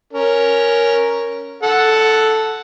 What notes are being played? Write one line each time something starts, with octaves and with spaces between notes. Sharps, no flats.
C#4 A#4
A4 F#5